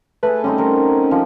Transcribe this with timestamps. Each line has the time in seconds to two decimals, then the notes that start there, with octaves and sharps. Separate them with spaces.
0.23 A3 G#4 B4
0.44 G3 C4 C#4 D#4
0.58 A#4 F#5
1.11 F3 G4